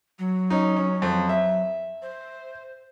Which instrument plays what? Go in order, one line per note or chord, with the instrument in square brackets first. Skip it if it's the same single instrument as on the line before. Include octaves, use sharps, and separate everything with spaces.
[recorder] F#3
[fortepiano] C#4 D#4
C#4
F2
E5
[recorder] C5